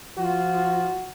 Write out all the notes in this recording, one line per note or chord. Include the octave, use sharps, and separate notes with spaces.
F3 F4 F#4